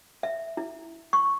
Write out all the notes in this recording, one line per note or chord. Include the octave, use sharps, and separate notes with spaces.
E5
E4
C#6